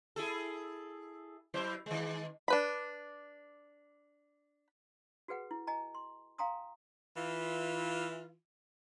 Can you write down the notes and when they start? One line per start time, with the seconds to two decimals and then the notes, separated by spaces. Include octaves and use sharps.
0.16 E4 G#4 A4
1.54 F#3 E4 C5
1.86 D#3 G#3
2.48 D4 B4 B5
5.28 F#4 G#4 B4 F#5
5.51 E4
5.67 D#5 G#5 A#5
5.95 C6
6.38 F5 G5 G#5 A#5 C6 D#6
7.17 E3 F4